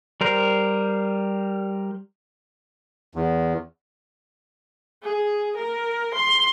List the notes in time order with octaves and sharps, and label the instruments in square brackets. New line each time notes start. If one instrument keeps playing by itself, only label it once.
[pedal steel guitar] G3 A#4 C5
[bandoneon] E2
[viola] G#4
A#4
C6